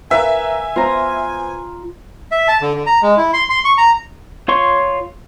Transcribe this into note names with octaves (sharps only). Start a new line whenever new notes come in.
A#4 B4 E5 F5 G#5
B3 F4 C5 A#5
E5
A5
D3
D3
A#5
G#3
E4
C6
C6
C#6
A#5
F4 C#5 C6 C#6